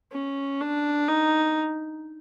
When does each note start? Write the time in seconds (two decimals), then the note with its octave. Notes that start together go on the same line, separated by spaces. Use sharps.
0.12 C#4
0.61 D4
1.08 D#4